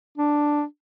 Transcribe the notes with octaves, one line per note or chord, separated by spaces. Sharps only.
D4